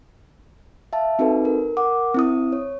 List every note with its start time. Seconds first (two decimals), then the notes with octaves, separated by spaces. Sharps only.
0.93 E5 F5 A5
1.19 C4 D#4 F#4 A4 B4
1.45 A#4
1.77 A#4 F#5 D6
2.14 C4 E4 D#6
2.53 C#5